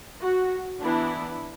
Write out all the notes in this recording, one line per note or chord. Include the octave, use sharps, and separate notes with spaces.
F#4
E3 B3 D4 E4